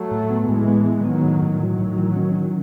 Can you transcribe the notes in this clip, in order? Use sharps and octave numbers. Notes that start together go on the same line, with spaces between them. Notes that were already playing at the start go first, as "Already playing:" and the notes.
Already playing: F#3 A3
A2
B3
A2 E3 G#3
B3
B3
D#3 F#3 B3
A2
A2
D#3 E3 F#3
A2
E3
C#4
C#4